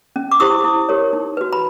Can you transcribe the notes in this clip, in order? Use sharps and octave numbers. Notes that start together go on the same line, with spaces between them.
C#4
D6
E4 G4 C5 C#6 D#6
E4
G4 A#4 C#5
D#4
F#4 B4
B5